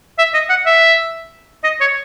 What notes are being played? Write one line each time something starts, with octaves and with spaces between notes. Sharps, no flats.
E5
D#5
F#5
E5
D#5
C#5